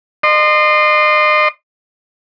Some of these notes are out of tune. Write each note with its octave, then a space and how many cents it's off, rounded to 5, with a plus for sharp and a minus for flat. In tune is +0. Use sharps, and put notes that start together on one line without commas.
D#5 -40 C6 -5